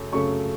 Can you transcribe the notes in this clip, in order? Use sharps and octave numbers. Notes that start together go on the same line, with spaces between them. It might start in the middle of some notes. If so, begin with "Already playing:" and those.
Already playing: F#2 C#3 A3
F#2 C#3 A3 C#6